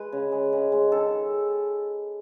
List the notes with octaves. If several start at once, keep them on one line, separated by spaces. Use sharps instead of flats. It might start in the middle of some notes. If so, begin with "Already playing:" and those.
Already playing: G#3 B4
C#3
G#3
C#3
G#3
D#3 A4